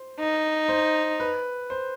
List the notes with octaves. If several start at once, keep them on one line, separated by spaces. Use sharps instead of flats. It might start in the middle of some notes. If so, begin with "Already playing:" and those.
Already playing: C5
D#4
C5
B4
C5